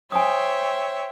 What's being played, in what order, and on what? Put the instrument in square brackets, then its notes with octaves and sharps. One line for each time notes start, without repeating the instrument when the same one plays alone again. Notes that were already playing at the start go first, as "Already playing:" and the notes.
[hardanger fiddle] C5 [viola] C#5 E5 [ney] G5 [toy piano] G#5 D#6